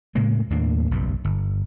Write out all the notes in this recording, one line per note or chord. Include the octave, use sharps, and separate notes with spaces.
A2 C#3 G#3 A#3
D#2 A2 A#3 D4
F#1 B1 G2
G1